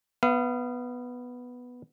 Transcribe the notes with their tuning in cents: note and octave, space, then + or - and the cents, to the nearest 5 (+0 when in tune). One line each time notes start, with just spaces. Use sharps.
B3 +0 F5 -35